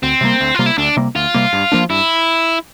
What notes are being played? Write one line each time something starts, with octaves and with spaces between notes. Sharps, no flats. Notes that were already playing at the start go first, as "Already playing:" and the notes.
D2 C4
C3 G3 A#3
D2
C3 G3 A#3 F4
E4
D2 D4
C3 G3 A#3
D2 F4
C3 G3 A#3
G2
F3 A#3 D4
G2 E4